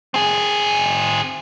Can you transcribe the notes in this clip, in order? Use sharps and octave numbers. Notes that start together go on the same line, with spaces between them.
C4 G#4